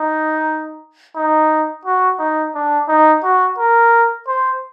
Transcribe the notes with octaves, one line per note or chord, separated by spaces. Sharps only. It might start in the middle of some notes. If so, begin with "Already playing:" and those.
Already playing: D#4
D#4
F#4
D#4
D4
D#4
F#4
A#4
C5